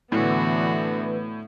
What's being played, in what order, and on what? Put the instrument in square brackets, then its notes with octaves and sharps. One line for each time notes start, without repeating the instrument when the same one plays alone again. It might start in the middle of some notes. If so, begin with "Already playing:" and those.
[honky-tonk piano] A2 [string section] D3 B3 [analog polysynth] E3 [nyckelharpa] F#4